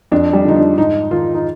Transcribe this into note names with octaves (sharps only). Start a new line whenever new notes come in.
F2 D4
G3
D3 F3 D#4
D4
G#2 D#4
D#3 F4
D#4